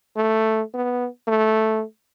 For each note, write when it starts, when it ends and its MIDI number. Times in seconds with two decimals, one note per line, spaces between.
0.16 0.62 57
0.74 1.07 59
1.27 1.83 57